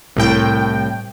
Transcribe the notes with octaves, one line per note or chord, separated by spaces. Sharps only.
C2 A2 G5